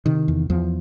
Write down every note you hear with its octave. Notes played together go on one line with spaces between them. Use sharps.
C3 D#3
E2
E2 F3